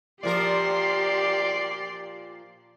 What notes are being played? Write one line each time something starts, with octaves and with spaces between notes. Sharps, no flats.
A#2 F3 G4 A#4 D5 C6